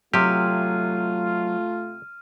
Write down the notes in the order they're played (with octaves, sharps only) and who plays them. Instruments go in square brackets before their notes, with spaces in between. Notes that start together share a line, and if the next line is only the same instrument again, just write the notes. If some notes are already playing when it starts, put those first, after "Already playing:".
[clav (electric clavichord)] C3 G4 [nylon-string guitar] F#3 [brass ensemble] A3 F4 [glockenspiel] F6 D#7